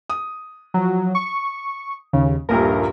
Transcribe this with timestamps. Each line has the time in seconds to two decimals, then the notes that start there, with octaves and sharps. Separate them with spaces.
0.10 D#6
0.74 F3 F#3
1.15 C#6
2.13 D#2 C#3
2.49 D#1 A#1 G2 A#4